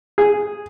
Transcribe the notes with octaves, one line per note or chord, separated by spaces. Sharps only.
G#4